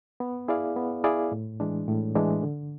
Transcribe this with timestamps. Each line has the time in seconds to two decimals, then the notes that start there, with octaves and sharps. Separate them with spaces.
0.20 B3
0.48 E4 G#4 D5 F5
0.76 B3
1.04 E4 G#4 D5 F5
1.32 A2
1.60 E3 G#3 D4
1.88 A2
2.15 E3 G#3 D4
2.43 D3